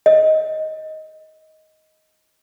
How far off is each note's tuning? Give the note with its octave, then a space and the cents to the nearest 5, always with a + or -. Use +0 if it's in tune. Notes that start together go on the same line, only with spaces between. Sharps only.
D#5 +10